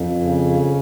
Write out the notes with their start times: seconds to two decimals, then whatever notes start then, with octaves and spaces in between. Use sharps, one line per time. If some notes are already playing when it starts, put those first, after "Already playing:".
Already playing: F2
0.20 C#3